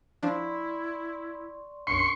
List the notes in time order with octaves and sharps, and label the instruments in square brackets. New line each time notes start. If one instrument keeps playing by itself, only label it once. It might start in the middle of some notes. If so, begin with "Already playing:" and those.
[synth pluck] F3 D4 [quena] E4 [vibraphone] D5 C6 C#6
[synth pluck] B1 F#2 [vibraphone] D4 [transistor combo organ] C6 C#6